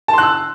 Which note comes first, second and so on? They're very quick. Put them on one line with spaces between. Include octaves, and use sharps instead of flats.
A5 C6 F#6 E6